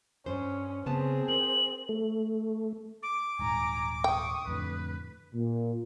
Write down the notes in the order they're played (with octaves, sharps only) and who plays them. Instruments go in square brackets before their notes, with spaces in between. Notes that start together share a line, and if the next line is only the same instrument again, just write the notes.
[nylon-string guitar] G2 C5 [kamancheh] C#4
[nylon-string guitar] C#3 B3 A5 [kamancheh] C4 G#4
[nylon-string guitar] A#4 [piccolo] F#7
[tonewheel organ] A3
[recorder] D6
[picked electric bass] D#1 G#2 [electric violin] G#5 A#5
[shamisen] G5 [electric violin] C#6 D#6
[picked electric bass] F2 A2 D3 [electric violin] B4
[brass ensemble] A#2